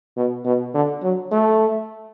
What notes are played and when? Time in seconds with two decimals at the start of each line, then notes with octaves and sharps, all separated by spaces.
0.17 B2
0.46 B2
0.74 D3
1.03 F#3
1.32 A3